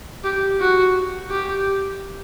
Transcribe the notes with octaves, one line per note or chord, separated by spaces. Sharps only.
G4
F#4
G4